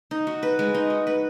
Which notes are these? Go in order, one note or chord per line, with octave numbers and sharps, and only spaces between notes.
D#4
F#4
B4
G#3
D#4
F#4
B4